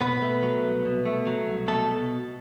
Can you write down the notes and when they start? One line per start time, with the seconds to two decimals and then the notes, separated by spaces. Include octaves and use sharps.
0.01 B2 B3 B4
0.22 A3
0.43 F#3
0.63 C2
0.85 B2
1.05 A3
1.27 F#3
1.47 C2
1.68 B2 A3 A4